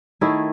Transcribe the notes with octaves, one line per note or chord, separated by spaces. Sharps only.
D#3 A3 E4 G#4